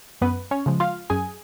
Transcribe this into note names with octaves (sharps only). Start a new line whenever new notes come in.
F#2 B3 B4
C#4 C#5
C#3 F3 G#3
F4 F5
F#2 G#4 G#5